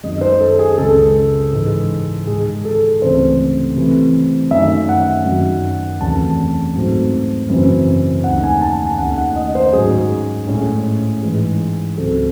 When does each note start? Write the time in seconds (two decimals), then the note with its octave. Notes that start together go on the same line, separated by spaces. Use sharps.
0.03 F#2 D#3 G#3 D#5
0.21 C5
0.41 A4
0.59 G#4
0.78 C#2 C#3 G#3 A4
1.53 G#2 E3 G#3
2.27 G#2 D#3 G#3 G#4
2.65 A4
3.02 C#2 C3 E3 A3 C#4 C5
3.76 C3 E3 A3
4.51 F#2 D#3 A3 C#4 E5
4.89 F#5
5.25 F#2 D#3 F#3 C#4
6.00 E2 C3 F#3 A3 C#4 A5
6.75 G#2 F#3 A3 C4
7.49 F#2 C#3 E3 C4
8.24 D#2 D#3 A3 C#4 F#5
8.43 G#5
8.61 A5
8.80 G#5
8.98 D#2 D#3 A3 C#4 F#5
9.18 F#5
9.36 D#5
9.55 C5
9.73 G#2 F#3 C#4 G#4
10.48 A2 G#3 C#4
11.22 G#2 E3 G#3
11.98 C#2 C#3 F#3 C4 A4